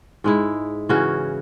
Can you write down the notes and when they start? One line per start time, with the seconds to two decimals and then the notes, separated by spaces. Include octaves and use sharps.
0.24 G#2 G#3 E4
0.89 C#3 E3 C#4 F#4